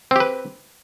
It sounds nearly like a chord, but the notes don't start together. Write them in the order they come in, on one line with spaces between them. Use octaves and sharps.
C4 G4 B4